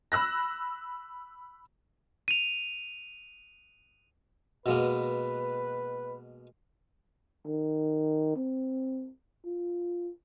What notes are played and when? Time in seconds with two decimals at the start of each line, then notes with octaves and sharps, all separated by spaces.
0.12 B5 E6 F#6 A#6
2.28 D#7 F7
4.66 B2 G#3 A#3 B4
7.46 D#3
8.37 C4
9.45 F4